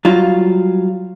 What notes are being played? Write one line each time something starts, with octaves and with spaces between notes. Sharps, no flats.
F#3 G3 F4